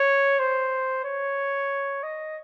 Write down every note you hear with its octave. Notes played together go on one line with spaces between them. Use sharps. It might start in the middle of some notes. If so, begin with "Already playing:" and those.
Already playing: C#5
C5
C#5
D#5